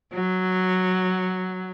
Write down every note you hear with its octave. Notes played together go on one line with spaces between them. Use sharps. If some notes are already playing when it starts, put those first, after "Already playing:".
F#3